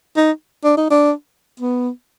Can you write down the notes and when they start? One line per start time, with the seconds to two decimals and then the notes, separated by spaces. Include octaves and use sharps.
0.17 D#4
0.64 D4
0.77 D#4
0.90 D4
1.60 B3